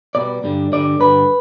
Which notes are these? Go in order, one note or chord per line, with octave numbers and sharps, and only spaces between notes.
B2 G3 B3 D5
G2 D3 G3
G2 D3 G3 D5
G2 D3 G3 B4